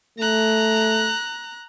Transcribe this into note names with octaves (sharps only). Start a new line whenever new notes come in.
A3 A#5 F#6